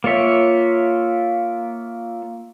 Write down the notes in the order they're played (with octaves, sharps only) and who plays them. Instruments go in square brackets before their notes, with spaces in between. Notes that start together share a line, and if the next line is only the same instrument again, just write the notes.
[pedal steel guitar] A#3 F4 C#5 E5